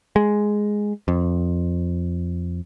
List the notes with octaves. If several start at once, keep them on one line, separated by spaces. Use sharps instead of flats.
G#3
F2